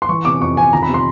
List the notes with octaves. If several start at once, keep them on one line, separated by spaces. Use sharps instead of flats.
C6
E3 C#6
C3 D6
F2 C#6
F2 G#5
D#3 A#5
B5
C3
C6